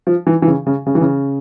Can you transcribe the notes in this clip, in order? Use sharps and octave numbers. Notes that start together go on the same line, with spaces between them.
F3
E3
E3
C#3
C#3
C#3
E3
C#3